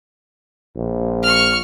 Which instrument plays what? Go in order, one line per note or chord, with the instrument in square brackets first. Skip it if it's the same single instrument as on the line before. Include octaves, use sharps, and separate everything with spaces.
[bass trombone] A#1
[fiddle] C#6 F6